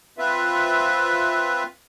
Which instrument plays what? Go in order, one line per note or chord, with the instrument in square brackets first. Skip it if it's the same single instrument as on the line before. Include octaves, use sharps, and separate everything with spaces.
[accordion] C4 F4 B4 E5